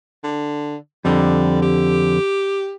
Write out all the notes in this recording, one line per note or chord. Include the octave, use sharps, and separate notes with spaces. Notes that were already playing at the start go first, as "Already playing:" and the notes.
D3
F2 D3 G3
G4